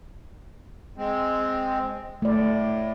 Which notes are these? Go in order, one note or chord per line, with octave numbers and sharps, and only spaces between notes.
G#3 C4
A2 A3 D5